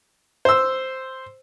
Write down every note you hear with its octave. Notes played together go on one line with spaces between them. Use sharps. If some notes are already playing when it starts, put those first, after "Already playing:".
C5 E6